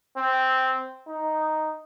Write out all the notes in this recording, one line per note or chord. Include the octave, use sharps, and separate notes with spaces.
C4
D#4